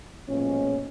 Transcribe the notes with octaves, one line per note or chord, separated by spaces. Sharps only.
B1 A#2 F3 G#3 C#4